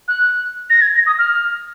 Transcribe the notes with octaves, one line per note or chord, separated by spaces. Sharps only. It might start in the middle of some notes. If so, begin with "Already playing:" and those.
F#6
A#6
G#6
A#6
D#6
F6